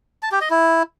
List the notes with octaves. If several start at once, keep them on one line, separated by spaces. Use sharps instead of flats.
A5
G4
D#5
E4